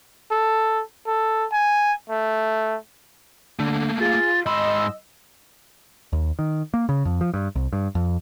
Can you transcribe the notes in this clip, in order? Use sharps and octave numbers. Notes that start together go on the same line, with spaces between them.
A4
A4
G#5
A3
D3 A3 A#3
F4 G#4 A6
G#2 D#5 B5 C6 E6
D#2
D#3
A#3
C#3
F2
F3
G2
C2
G2
F2